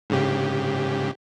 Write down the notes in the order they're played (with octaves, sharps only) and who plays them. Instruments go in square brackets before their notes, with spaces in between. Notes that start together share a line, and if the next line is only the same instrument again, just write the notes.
[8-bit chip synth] G#2 C#3 G4